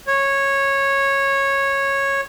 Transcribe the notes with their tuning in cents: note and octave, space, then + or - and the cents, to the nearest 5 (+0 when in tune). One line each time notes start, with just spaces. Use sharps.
C#5 -10